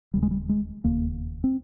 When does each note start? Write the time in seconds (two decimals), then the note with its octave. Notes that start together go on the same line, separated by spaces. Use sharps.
0.14 E1 D#2 C#3 G3
0.23 G#3
0.31 G3
0.49 G#3
0.84 E1 D#2 C#3 A#3
1.44 C4